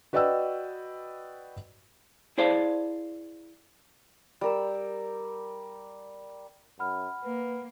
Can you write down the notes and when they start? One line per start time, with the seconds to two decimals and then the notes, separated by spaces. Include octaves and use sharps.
0.13 F#4 B4 D5 D#5 G5 E6
2.38 E4 G#4 C5 D5 F5 A5
4.41 G3 A#4 E6
6.79 F#2 F#5 B5 F6
7.24 A#3 B4